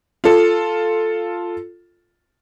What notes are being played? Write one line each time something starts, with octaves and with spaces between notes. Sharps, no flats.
F4 A4